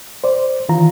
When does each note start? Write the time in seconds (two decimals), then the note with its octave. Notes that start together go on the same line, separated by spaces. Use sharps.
0.24 C5 D5
0.69 D#3 E3 F4 A#5